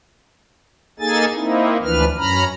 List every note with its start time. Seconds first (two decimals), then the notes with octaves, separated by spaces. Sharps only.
0.99 A#3 D#4 G#4 A4 G#5 A6
1.34 A#3 C4 D#4 E4
1.82 D2 E3 F3 D4 B4 F6
2.17 F#2 C#4 A#5 B5 F6